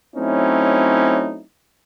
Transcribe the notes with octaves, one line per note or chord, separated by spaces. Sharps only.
F#3 A3 C4 C#4 D#4 E4